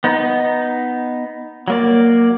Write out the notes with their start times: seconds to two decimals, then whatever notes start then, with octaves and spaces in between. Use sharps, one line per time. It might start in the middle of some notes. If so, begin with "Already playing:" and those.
0.04 B3 D#4
1.68 F#3 A#3 D5